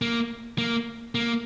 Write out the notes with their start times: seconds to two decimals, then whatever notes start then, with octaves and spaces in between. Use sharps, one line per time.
0.02 A#3
0.58 A#3
1.15 A#3